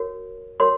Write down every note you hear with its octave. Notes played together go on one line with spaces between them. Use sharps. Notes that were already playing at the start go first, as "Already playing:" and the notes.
Already playing: F#4 A#4 C#5
F#4 A#4 C#5 C6